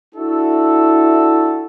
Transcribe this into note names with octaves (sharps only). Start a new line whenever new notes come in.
D4 E4 F#4 A4